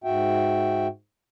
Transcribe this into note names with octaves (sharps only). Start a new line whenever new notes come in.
G#2 F#4 E5 G5